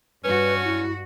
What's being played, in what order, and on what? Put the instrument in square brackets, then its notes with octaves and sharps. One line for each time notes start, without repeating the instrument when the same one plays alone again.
[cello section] G2 F#4 [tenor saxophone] C#4 [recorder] B4
[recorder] E4